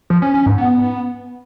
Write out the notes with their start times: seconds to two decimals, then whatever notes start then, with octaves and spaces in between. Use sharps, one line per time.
0.10 F3
0.22 C#4
0.34 C#4
0.46 G#2
0.58 B3